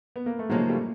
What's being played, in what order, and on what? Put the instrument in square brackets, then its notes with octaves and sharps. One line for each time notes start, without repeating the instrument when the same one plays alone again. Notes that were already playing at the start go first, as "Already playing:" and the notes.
[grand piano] B3
A#3
A3
[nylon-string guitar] C#3 F3 A#3 D#4 [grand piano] F#3 G#3
[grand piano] G3 A3